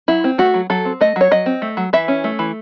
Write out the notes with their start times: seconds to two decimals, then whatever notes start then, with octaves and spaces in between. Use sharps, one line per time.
0.08 F#3 E4
0.24 C4
0.38 A3 F#4
0.54 F#3
0.70 F#3 A4
0.85 C4
1.01 A3 D#5
1.16 F#3 C#5
1.31 F#3 D#5
1.46 C4
1.62 A3
1.77 F#3
1.93 E3 E5
2.08 C#4
2.24 A3
2.39 E3